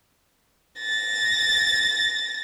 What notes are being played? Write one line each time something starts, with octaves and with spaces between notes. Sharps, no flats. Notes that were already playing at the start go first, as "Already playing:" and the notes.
A6 A#6